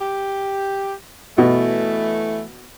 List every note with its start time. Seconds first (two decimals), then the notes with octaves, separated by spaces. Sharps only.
0.01 G4
1.38 B2 E3 A3